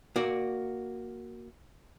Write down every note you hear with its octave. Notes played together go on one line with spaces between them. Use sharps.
A#3 F#4 D5